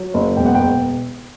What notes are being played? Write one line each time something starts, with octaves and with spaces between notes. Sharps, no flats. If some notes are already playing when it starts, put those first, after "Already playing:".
Already playing: F#3
F#1
E1 G5
F#5
E1 G5